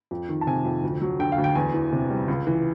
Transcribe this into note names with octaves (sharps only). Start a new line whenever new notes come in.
F2
D#3
A5
C3 G#5
F2
D2
F#3
D3 G5
F5
D2
G5
E2 G#5
E3
C3
G3
C#2
E3